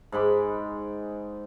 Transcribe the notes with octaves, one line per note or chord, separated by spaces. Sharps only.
G#2 G#3 B5 D6